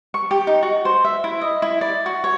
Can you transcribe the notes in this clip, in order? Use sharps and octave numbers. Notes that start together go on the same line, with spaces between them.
C#6
G4
D#4
F#4
C5
E5
E4
D#5
E4
D5
F#4
C#5